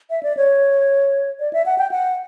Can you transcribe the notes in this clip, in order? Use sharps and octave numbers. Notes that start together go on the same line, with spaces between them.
E5
D5
C#5
D5
E5
F#5
G5
F#5